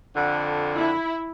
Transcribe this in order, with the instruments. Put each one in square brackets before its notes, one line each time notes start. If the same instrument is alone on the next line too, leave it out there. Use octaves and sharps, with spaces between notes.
[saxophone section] F2 D3
[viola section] E4